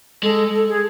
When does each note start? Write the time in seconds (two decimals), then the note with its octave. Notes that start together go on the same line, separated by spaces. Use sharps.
0.23 G#3 A4
0.53 A4
0.68 G#4